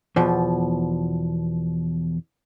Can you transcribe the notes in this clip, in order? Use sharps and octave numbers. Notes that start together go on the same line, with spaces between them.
E2 B2 F3